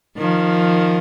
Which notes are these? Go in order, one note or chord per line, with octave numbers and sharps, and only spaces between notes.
D#3 F3